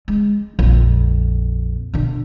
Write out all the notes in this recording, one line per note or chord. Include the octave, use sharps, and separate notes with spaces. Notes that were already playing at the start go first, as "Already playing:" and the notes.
G#3
A#1 F2
B2 D3